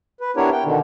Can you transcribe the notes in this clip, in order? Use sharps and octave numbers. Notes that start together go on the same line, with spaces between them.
B4
B3 D4 E4 G4 A#4 C#5
G5
B2 D3 D#3